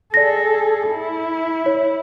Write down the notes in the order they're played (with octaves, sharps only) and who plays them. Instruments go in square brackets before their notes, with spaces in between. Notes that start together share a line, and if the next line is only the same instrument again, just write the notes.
[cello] G#4 A4 [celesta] D5 A#6
[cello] E4
[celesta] C#5